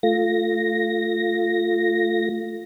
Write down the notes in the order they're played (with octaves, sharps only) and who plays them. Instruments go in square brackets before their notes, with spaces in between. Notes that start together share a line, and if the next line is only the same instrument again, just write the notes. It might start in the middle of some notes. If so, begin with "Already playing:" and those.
[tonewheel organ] A3 F4 A#6